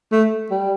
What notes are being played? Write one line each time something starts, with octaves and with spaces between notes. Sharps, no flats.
A3
G3